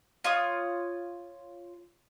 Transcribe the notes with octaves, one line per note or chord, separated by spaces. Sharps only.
F4 C#5 D#6